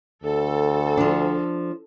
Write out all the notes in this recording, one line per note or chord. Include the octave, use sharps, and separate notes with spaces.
D2 A4
F3 D4